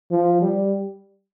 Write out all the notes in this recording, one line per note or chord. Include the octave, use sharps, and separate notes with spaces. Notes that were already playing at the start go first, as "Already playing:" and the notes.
F3
G3